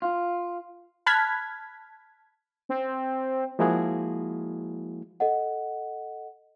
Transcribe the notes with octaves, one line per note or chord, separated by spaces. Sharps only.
F4
A5 B5 F6 F#6 G#6 B6
C4
F3 G#3 A#3 E4 F#4 G#4
A4 D#5 F#5